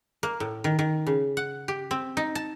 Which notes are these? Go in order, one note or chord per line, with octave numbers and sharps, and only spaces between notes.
A#3
A2
D#3
D#3
C#3
F#5
G4
C4
D#4
A5